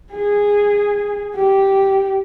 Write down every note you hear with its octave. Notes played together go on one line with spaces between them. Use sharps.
G#4
G4